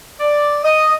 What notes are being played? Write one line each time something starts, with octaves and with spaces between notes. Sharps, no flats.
D5
D#5